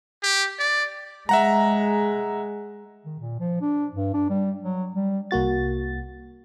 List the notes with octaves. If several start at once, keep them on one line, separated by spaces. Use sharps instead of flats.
G4
D5
G#3 E5 F#5 A#5
D#3
A#2
F3
D4
G2
D4
G3
F#3
G3
C2 A#3 F#4 A6